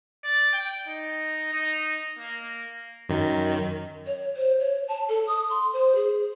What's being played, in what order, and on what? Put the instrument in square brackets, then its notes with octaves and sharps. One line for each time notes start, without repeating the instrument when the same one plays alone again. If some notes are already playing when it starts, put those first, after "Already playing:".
[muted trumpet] D5
G5
D#4
D#4
A#3
[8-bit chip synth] F#2 D#3
[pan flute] C#5
C5
C#5
A5
A4
D#6
C6
C5
G#4